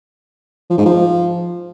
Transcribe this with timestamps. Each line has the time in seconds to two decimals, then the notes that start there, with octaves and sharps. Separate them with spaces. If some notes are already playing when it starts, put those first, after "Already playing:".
0.70 F3
0.78 G#2
0.85 F3